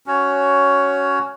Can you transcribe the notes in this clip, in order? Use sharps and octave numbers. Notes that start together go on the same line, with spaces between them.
C#4 F#4 C#5